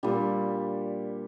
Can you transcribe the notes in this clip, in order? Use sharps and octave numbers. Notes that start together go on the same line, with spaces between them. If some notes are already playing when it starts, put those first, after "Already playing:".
A#2 G3 D4